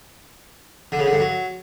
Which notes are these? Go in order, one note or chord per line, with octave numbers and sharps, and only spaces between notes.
D3
C#3
D3
G2
F#3